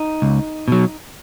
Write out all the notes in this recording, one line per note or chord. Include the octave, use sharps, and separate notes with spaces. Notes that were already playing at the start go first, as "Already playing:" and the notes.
Already playing: D#4
C#2
B2 F#3